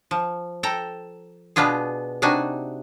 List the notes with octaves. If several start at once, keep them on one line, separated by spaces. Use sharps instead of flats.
F3
A4 G5 A#5
B2 B3 D4 F4 G#4
C3 D4 D#4 F#4 G#5